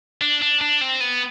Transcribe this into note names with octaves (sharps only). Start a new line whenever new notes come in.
D4
D4
D4
C4
B3